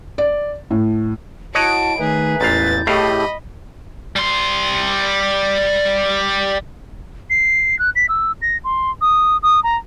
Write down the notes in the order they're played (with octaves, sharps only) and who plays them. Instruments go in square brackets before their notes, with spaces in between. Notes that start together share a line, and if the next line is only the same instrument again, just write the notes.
[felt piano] D5
A2
[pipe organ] E4 [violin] F#4 D7 [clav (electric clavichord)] C#5 D#5 F#5 [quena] A5
[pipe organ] D#3 A3 D#4 [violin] G#4 [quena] B4
[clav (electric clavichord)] A1 A#2 F5 [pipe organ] E2 E4 G6 [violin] A6
[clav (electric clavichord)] A2 A3 F5 [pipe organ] E4 G#4 [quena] G4 [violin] D#5 B5
[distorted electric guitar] G3 C6
[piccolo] C7
F#6
B6
E6
A#6
C6
D#6
D#6
A#5